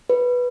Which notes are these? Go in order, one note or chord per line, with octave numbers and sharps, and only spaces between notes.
B4